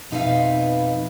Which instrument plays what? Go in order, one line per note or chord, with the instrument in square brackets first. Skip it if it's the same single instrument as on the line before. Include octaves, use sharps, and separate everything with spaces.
[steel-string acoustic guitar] F2 B2 D#4 B4 E5 F5